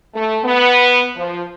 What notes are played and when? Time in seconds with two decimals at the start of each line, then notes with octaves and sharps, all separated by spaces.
0.15 A3
0.44 B3
1.15 F3